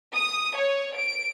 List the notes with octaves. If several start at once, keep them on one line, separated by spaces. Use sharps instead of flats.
D#6
C#5
D7